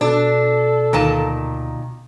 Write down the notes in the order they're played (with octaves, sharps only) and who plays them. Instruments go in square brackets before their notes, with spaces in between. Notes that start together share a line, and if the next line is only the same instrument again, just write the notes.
[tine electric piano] B2 [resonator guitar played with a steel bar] D4 [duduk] A4
[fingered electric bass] D2 [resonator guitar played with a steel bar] A#2 D#3 A5